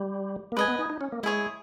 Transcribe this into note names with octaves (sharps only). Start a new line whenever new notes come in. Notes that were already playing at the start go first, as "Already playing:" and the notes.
Already playing: G3
A#3
G#3 B4 D#5 G#5
B3
D#4
D#4
C#4
A#3
G#3 E4 G#4 C#5